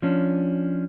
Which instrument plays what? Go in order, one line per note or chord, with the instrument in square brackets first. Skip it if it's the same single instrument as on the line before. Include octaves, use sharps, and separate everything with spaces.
[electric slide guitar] F3 C#4 D4